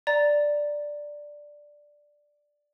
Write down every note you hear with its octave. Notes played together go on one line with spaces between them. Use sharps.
D5 A#5 A6